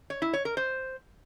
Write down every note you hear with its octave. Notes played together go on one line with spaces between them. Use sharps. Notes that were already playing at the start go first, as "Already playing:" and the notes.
C#5
E4
C#5
A#4
C5